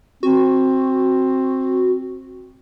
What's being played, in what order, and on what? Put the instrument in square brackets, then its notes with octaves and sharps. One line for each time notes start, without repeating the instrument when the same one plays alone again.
[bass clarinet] C4 [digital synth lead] F#4